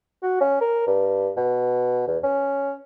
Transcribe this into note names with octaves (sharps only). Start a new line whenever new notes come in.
F#4
C#4
A#4
G2
B2
E2
C#4